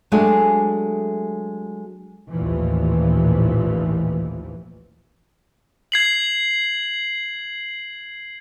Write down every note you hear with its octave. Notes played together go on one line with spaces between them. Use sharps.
F#3 G#3 A3 D4 G4 G#4
A1 D#2 A#2 E3 F3
G#6 C7 F#7